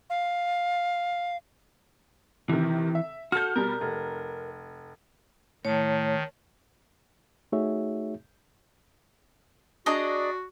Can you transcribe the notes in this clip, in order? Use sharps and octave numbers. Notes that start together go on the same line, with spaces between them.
F5
C3 D#3 E3
E5
F#4 A4 F6 G6
B2 G3 A#4
F1
A2 D#3 C#5 A5
A3 D#4 F#4 G#4 C#5 E5
D4 F#4 G#4 D5 D#5 A#5